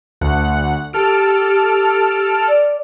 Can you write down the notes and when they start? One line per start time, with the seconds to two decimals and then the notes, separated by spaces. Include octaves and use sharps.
0.21 D2 F#5
0.93 G4 A4 F6 D7
2.47 D5